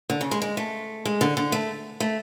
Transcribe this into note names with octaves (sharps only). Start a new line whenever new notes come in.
D3
C#3
G#3
G#3
A3
G#3
D3
D3
A3
A3